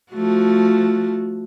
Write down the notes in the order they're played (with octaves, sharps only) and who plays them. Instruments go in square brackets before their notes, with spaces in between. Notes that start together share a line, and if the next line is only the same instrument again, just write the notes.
[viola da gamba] F3 A3 F#4